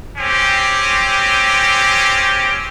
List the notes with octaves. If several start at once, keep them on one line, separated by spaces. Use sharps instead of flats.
C4 C#4 G4